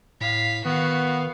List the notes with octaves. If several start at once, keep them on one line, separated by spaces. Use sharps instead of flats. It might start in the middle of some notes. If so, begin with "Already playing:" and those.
A2 F5 B6
D#3 B3 F#4 F5